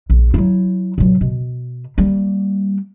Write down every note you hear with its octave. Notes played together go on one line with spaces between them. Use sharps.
A#1
F#3 E4
A#2 F#3
B2
G3 A#3